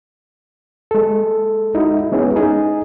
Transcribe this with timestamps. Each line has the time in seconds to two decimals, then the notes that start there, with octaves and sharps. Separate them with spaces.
0.91 G#3 A4
1.75 D#4 E4 F#4
2.12 G#3 B3 C#4 E4 G#4
2.36 D#4 G#4